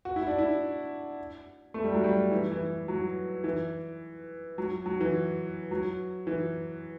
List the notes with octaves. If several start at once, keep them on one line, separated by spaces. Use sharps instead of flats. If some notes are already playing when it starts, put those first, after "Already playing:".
F#4
E4
D4
E4
A3
G3
F#3
G3
E3
E3
F#3
E3
F#3
F#3
E3
F#3
E3